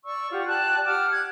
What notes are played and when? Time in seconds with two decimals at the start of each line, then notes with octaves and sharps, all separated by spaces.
0.04 D5 C#6 E6
0.31 F4 G4 F#5
0.47 D5 G5 A5 F#6
0.85 G4 F#5 D6 F6
1.12 F#6 G#6